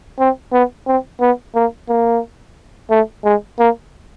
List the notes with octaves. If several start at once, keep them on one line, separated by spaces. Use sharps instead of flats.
C4
B3
C4
B3
A#3
A#3
A3
G#3
A#3